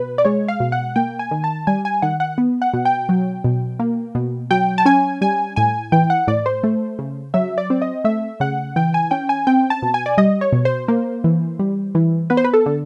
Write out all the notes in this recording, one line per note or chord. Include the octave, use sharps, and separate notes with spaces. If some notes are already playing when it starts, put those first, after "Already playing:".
Already playing: B2 B4
D5
G#3 C#5
F5
B2
F#5
A#3 G5
G#5
D#3
A5
G3 G#5
G#5
D#3 F#5
F#5
B3
F#5
B2
G5
F#3
B2
A#3
B2
F#3 G5
A5
C#4 G#5
G3 G#5
A2 G#5
E3 G5
F#5
A2 D5
C5
A3
C#3
F#3 E5
D5
C4
D#5
A3 E5
C#3 F#5
E3 G5
G#5
C#4 G5
G#5
C4 G5
A5
B2
G#5
D5
G3 D#5
C#5
B2
C5
A#3
E3
G3
E3
B3 B4
C5
B4
A4
D3